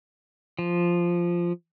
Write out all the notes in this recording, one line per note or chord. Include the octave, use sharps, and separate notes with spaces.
F3